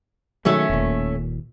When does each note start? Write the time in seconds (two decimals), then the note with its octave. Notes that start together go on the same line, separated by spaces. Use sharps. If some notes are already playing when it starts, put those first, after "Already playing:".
0.45 D#3 F#3 G#3 A3 C#4
0.70 E1 D#2 A#2